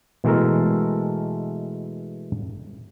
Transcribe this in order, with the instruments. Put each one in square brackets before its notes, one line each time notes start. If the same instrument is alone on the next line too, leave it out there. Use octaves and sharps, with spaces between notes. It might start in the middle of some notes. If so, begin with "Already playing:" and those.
[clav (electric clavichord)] B2 E3 G#3 A3 A4 A#4